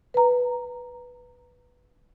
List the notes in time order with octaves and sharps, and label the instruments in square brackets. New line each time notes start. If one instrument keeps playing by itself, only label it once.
[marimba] B4 A#5